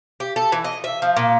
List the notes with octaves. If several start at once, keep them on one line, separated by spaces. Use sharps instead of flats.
G4
A4
E3
D#5
E5
F3
A#2